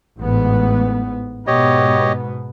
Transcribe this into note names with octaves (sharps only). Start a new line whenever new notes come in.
A1 G#2 B3
G#2 B2 B3 G4 C#5 D#5